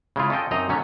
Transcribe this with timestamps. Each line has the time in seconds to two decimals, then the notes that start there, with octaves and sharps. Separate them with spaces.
0.16 C#3 G#3 E4 F4
0.30 C#4 F4 A4 D#5 G5
0.51 F#2 C4 D#4 D#5 A#5
0.69 D3 F#3 A3 C#4